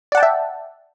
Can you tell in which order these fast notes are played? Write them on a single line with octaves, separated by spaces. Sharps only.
D5 F#5 A5 G5 E5